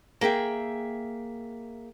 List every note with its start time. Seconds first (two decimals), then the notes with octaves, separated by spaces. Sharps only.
0.21 A#3 G#4 E5 G5